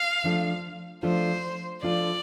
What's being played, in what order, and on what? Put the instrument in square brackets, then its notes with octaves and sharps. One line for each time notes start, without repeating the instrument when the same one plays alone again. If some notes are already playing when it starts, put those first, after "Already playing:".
Already playing: [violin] F5
[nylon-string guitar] F3 A3 D4 F4 A4
[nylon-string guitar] F3 A3 D4 F4 A4 [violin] C5
[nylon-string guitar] F3 A3 D4 F4 A4 [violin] D5